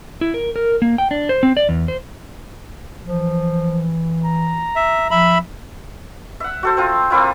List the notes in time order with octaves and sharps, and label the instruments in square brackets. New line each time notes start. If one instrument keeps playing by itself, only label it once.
[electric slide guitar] E4
A#4
A#4
A#3
G5
D4
C5
C4
D5
E2
C5
[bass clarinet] E3 [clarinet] F3
[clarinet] A#5
[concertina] E5
[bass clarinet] F3 [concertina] E5 B5
[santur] E5 F#5
F#4 A4 C5
C4 F4
A#3 C4 E4 F4